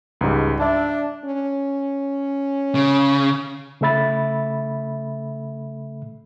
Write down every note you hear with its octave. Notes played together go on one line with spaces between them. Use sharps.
C#2 G#2 G3
D4 D5 E5 A5
C#4
C#3
C#3 A3 A4 E5 B5 A6